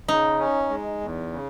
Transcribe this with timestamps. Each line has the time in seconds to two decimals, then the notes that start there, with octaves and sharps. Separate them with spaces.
0.08 C#3 D#4
0.39 C#4
0.69 G#3
1.01 E2
1.32 C#3